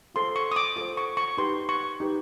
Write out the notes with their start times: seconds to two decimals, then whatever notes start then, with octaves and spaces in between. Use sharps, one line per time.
0.14 F4 A4 C5 C6
0.36 C#6
0.52 D#6
0.56 D6
0.76 F4 A4 C5 D6
0.97 C#6
1.17 C#6
1.38 D#4 G4 B4 C6
1.69 C#6
2.00 D#4 G4 B4